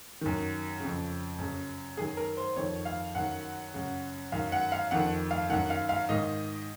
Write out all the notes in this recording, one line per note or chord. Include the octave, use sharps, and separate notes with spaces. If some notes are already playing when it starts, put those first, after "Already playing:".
F#2 D#3
F2 C#3
F#2 C#3
F#2 D#3 G#4
A#4
C5
F2 D#3 C#5
F5
F#2 D#3 F#5
F#2 C#3
F#2 D#3 F5
F#5
F5
F2 D#3 F#5
F5
F#2 D#3 F#5
F5
F5
G#2 D#3 D#5